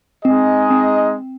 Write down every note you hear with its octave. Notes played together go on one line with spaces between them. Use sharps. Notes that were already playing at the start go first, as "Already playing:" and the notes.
G#3 C4 D#4 G#4 D#5
C4